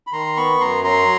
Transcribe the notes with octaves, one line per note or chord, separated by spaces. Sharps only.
B5
D#3 A#5 C6
B3 B5 C#6
F#2 A#5 C6
F#3 A#5 C6